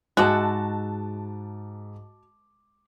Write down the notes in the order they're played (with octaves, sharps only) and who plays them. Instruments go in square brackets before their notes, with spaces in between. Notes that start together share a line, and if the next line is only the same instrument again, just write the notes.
[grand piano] G#2 D6 [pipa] G#3 [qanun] F#4 E5 [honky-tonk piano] A5 F#6